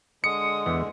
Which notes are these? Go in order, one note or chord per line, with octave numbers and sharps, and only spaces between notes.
D3 G#3 D#6 C#7
E2 E3